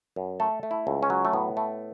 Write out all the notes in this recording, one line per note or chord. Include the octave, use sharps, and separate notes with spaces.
F#2
A3 A4
A3
E4
C#2
C#4
F#3
A3
A2 B3
A3